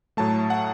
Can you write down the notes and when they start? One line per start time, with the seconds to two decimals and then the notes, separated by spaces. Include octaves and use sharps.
0.17 A2 F#3 A3 A5
0.50 F#5